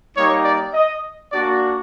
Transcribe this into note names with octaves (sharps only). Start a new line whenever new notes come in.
G3 A#3 D#4 G4 C#5
D5
D#5
A#3 D4 F#4 D5